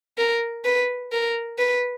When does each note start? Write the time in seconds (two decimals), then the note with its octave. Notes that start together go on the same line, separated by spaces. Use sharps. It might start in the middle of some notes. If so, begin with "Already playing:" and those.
0.18 A#4
0.64 B4
1.12 A#4
1.58 B4